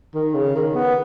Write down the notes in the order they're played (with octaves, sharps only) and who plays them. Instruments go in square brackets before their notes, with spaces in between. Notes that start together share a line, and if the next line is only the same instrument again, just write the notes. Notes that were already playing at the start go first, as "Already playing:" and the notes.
[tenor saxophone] D#3
C#3
D#3
B3